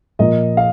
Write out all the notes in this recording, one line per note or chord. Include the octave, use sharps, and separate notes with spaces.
A#2 F3 A#3 D#5
F5